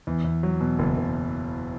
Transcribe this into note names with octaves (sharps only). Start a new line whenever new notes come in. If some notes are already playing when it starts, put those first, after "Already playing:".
E2
E2
F#3
B2
F#1
F#1